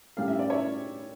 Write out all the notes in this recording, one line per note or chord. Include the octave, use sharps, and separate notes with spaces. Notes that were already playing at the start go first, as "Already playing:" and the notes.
A2 G3 C#4 F5
E5
D5
C#5 E5